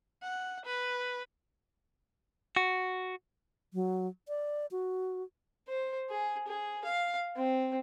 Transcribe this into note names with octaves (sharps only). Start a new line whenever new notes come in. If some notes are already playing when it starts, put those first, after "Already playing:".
F#5
B4
F#4
F#3
D5
F#4
C5
G#4
G#4
F5
C4